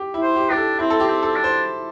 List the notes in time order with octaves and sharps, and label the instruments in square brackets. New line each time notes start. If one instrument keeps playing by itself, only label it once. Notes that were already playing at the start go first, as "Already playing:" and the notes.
Already playing: [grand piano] G4
E4
[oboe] C5
[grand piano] G4
[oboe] D4 [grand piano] G4
[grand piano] A4
[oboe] C4 [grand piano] E4
[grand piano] A4
G4
[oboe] C4
[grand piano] A4
[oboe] D4
[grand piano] C5